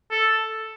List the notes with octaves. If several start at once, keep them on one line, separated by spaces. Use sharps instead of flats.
A4